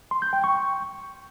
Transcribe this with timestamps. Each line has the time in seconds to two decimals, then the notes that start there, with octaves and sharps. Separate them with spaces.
0.11 C6
0.22 G6
0.33 G5
0.44 C#6